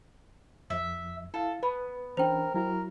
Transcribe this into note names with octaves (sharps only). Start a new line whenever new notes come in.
F2 F3 E5
E4 A4 F5
B3 B4
E3 C#4 D4 A#4 C5 G5
F#3 E4 F#4 A#4